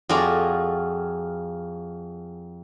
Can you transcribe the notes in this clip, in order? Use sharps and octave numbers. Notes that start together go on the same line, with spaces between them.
F2 F4 F#4 G#4 D5